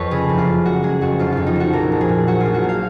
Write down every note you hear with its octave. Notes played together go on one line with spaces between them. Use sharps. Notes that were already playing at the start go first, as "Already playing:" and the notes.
Already playing: F2 B4 C#5
C#3 G#4
F#1
F4
C#3
G#3 F#4
G#3 G#4
F2 F#4
F1 F4
F2 F4
D#4
F3 F#4
A#1 A#4
A#1
G#4
A#2
F#3 F#4
F4
A#1
F#4
A#3
F5